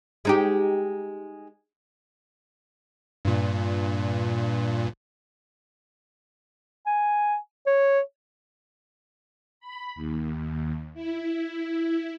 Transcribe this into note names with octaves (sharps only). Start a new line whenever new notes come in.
G#3 D#4 G4
G2 A#2
G#5
C#5
B5
D#2
E4